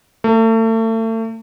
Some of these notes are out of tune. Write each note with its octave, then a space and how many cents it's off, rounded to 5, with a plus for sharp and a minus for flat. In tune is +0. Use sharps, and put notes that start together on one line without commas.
A3 +35